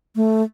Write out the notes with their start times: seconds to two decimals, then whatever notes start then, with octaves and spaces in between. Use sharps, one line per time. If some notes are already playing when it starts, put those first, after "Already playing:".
0.16 A3